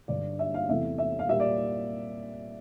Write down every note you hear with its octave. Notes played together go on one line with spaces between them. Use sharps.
G2 D3 G3 D5
E5
F5
E2 C3 E3 A3 E5
E5
F5
A#2 G3 A#3 E5
D5